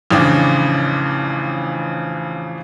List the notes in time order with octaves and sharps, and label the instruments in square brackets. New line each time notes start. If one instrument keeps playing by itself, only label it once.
[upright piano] A1 F2 C#3 D4